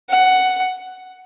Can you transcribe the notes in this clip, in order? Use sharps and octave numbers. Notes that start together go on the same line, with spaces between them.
F#5